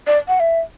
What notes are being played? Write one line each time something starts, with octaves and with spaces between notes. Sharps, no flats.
D5
F#5
E5